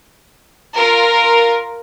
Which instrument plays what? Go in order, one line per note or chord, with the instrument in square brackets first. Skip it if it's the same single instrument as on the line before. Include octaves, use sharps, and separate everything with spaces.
[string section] F4 A#4